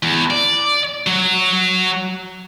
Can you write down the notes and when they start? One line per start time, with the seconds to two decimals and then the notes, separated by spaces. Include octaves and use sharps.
0.03 E2
0.30 D5
1.07 F#3